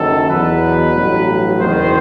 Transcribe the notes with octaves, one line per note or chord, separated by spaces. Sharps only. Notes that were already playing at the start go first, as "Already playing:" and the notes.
Already playing: F#1 F#2 D#3 A4
E2 B2 F#3 B4
A1 G2 F#3
F#1 E2 D#3 C5